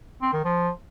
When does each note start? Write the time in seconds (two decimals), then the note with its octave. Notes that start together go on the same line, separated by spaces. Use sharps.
0.22 C4
0.33 D#3
0.44 F3